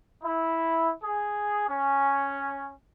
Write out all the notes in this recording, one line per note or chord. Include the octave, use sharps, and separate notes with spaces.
E4
G#4
C#4